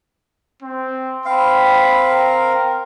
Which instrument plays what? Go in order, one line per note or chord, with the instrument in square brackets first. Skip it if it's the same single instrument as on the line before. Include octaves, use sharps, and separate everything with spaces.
[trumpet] C4
[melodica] C4 F5 [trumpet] B5
[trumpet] A#4